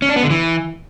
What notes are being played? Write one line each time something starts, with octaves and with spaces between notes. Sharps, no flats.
C#4
D4
B3
D3
E3